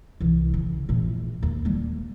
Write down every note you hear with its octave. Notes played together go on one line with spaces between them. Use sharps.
C2 E3
C#3
A#1 E2
D#2
G3 A#3